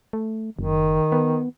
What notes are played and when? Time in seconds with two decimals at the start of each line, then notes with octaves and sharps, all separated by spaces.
0.13 A3
0.59 F#1 D#3
1.12 B3